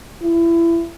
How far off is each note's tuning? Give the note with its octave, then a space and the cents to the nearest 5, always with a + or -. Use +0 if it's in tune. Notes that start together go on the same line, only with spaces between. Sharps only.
E4 +25